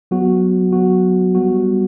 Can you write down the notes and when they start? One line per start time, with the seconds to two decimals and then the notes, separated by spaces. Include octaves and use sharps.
0.11 F#3 B3 F#4
0.72 F#3 B3 F#4
1.35 G3 B3 F#4